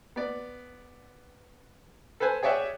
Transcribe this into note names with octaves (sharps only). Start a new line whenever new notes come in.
B3 D5
A4 B4 C5 G#5
G#4 C#5 D5 E5 F#5 G5